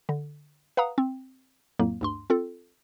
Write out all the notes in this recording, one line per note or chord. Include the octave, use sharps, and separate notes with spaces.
D3
B4 F5 F#5 A#5 D#6
C4
F2 A2 F#3 A#3
D2 G2 C6
C4 F4 A4